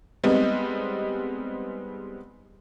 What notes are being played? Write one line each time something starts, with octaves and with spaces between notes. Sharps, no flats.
G3 G#3 B3 C4 D#4